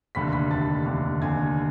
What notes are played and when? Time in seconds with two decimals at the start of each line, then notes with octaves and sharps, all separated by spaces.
0.15 F1 D#2 D3 B5 B6
0.33 B5 B6
0.50 F1 D#2 D3 A5 A6
0.86 F1 D#2 D3
1.22 F1 D#2 D3 G#5 G#6